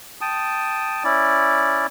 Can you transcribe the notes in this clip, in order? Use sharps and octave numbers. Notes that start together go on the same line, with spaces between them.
G5 A5 D#6
C#4 E4 D5